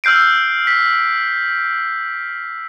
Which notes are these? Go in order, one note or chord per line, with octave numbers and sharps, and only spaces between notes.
E6 F6 G6 C7 D7
B6